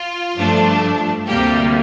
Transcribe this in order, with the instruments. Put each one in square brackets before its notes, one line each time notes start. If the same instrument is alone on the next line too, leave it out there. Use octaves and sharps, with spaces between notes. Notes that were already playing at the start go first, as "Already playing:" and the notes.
Already playing: [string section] F4
G2 F3 A3 D4
D2 C3 G3 A#3 G4